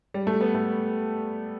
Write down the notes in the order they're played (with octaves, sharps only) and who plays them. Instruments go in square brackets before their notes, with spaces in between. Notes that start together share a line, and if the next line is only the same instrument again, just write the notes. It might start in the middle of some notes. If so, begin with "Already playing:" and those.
[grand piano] G3
A3
B3
A3